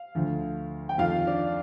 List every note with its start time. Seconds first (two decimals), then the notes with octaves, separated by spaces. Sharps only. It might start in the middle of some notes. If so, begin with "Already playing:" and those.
Already playing: F5
0.15 D2 D3 F3
0.89 G5
0.98 F2 D#3 F4 F5
1.27 D4 D5